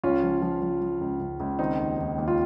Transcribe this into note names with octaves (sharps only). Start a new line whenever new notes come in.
C#2 C#4 F4
F3
F3
F3
F3
C#2
C#2
C#2
D#3 C4 D#4
D#2
D#2
D#2
F4